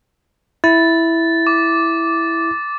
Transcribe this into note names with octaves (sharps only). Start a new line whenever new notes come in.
E4 A6
D6